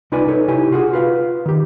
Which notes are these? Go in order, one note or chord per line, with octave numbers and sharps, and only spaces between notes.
C2 D#4 F4 B4 D5 G#5
D#4 A4 B4 C#5
C3 E4 G4 G#5
F4 F#4 G#4
F4 B4 F5
D#3 G4